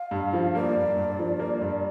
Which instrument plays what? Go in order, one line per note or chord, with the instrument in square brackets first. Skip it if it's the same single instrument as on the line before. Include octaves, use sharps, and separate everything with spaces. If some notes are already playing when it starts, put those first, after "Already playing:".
Already playing: [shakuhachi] F5
[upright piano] G2
F3
[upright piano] A#3 [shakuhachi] D5
[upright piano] G2
G2
F3
A#3
G2